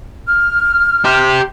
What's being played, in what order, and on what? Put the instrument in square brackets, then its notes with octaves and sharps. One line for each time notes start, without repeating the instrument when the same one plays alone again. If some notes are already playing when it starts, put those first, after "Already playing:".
[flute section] F6
[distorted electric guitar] G4 C5